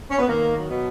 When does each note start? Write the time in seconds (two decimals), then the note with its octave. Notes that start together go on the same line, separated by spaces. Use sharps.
0.10 C#4
0.18 B3
0.27 D#3 A#3
0.55 F#3
0.68 B2 B3